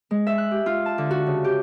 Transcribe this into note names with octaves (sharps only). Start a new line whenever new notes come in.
G#3
E5
F#6
G4
F4
A5
D3
F#4
C#3
G4